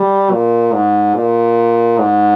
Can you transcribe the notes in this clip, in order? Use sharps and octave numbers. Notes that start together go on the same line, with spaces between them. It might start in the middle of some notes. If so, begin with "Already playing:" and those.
Already playing: G3
A#2
G#2
A#2
G#2